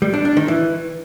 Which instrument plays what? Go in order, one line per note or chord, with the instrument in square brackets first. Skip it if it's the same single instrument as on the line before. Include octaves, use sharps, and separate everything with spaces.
[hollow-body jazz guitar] G3
D4
D4
D#3
E3